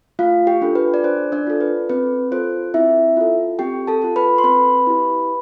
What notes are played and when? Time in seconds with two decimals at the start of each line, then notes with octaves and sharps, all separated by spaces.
0.19 A3 F4 F5
0.47 G4 G5
0.62 D4 F4 A4
0.75 B4
0.94 D5
1.04 D4 C5
1.32 D4 D5
1.47 F4 A4
1.61 B4
1.90 C4 B4
2.31 F4 A4 C5
2.74 C4 E4 E5
3.17 F4 A4
3.59 C4 G4 G5
3.87 A4 A5
4.02 F4 A4
4.16 B4 B5
4.38 C6
4.44 C4 B4 B5
4.87 E4 G4